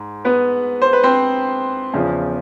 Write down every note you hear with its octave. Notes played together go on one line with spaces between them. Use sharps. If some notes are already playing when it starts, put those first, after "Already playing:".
Already playing: G#2
B3 B4
C5
B4
C4 C5
E2 C#3 F3